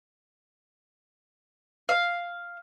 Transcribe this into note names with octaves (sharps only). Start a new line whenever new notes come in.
F5